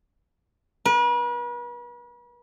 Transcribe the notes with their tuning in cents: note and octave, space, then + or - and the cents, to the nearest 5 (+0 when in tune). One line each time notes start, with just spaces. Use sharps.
B4 -40